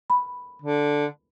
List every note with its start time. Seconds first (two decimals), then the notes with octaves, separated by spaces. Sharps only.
0.10 B5
0.62 D3